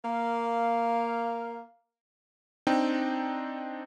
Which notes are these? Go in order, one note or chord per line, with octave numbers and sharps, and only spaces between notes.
A#3 F5
C4 D4 D#4 G5